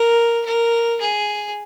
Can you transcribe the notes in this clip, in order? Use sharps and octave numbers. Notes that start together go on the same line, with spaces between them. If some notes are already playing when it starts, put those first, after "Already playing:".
Already playing: A#4
A#4
G#4